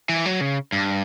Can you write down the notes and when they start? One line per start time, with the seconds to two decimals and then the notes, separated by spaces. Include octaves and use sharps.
0.09 E3
0.26 F#3
0.41 C#3
0.72 G2